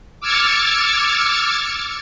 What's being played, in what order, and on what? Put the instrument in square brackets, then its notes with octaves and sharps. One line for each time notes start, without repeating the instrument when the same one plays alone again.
[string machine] D6 E6 F6 G#6 A6 C#7